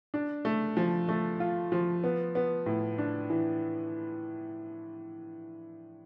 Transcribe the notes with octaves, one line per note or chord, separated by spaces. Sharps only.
D4
A3
F3
A3
F4
F3
B3
B3
A2
D4
E3